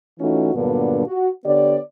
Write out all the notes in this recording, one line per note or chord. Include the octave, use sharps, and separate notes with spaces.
E3 A3 C#4 D#4 F4 F#4
G2 A#2 D3 F#3 B3 D4
F#4
D3 B3 G4 C#5 D5